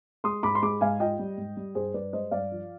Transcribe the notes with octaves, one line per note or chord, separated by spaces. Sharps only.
G#3 C6 D#6
G#2 B5 D6
C6
G#3 B5 D6
G#2 F5 G#5
F4 D#5 G5
G3
G#2
G3
G2 G#4 C5
G2 B4 D5
G#3 C5 D#5
G2 D5 F5
F3